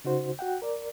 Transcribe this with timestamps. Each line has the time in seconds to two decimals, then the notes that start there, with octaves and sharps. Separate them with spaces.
0.05 C#3 D#4 F#4 C5
0.39 F#4 F#5 G5
0.62 A#4 D5